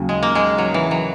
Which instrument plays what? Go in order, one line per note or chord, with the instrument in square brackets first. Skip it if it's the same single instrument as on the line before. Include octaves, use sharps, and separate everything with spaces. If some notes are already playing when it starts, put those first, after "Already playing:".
Already playing: [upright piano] D#2 C#3 F#3
[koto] G#3
A#3
G#3
F#3
E3
F#3